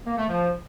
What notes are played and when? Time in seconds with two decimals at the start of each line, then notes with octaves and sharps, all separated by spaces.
0.06 A#3
0.17 A3
0.28 F3